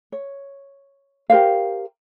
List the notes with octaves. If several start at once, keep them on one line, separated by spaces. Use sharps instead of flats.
C#5
G4 A#4 C5 F5